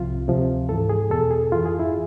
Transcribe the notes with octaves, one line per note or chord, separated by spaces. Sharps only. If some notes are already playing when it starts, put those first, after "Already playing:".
Already playing: C2 C3 F3 F4
D2 C3 F3
G#2 E3 A4
G#4
E2 B2 A4
G#4
F2 E3 F4
G#4
E4